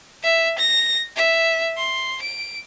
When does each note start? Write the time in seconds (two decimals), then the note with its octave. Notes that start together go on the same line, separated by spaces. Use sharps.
0.23 E5
0.58 A#6
1.16 E5
1.77 C6
2.22 D7